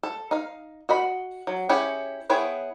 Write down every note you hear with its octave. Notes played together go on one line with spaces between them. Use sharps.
A4
D#4 F5
F#4 D#5 B5
F#3
C#4 E4 G4 G#4 C#5
B3 E4 G#4 C#5 G5